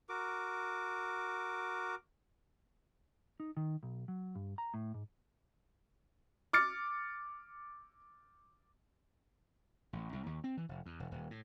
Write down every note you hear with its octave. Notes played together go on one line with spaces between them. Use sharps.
F#4 A#4 D6
D#4
D#3
B1
F#3
G2
A#5
A2
G#2
D6 F6 A6 C#7
A1
C2
D#2
C4
E3
F1
E2
E1
D#1
A2